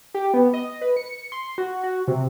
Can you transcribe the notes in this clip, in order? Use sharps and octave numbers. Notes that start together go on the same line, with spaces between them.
G4
B3
D#5
B4
C#7
C6
F#4
F#4
C3